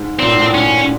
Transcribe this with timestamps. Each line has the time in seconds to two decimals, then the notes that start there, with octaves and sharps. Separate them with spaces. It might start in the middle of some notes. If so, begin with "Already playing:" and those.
Already playing: G#2
0.19 A#2 C4
0.27 A2
0.34 G#2
0.41 A2
0.54 G#2 C#4